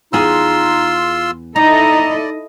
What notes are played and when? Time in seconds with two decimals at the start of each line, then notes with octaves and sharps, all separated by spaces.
0.13 E2 D#4 F4 G#4 C6 E6
1.56 D#4 E4 A4 D5 D#5 A#5